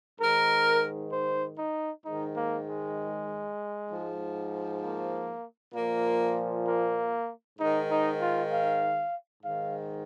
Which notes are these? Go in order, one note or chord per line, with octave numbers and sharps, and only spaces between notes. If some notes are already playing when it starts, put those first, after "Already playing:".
G#2 D#3 A#4
C5
D#4
G#2 D#3 D#4
A#3
G#3
G#2 F3
A#3
A#2 F3 A#3
A#3
G#2 D#3 D#4
D#4
F4
F5
G#2 D#3 F5